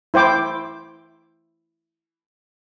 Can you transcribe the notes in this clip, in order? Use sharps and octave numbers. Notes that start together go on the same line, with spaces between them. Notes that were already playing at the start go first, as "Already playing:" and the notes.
E4 C5 G5 D6